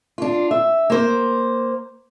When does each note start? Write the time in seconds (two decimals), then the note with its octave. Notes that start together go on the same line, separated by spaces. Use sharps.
0.18 D4 F4
0.51 E5
0.90 A#3 C5